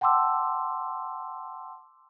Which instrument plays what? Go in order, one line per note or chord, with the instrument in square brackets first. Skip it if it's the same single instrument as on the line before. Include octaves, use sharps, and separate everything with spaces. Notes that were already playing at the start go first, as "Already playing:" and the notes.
[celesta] F#5 G5 A5 C6 D6 E6